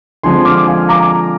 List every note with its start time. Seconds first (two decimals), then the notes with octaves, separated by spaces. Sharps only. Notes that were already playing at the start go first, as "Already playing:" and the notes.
0.23 D3 F3 G#3 C4 G#5 C6
0.45 D6 F6
0.67 F5 G#5
0.89 A#5 D6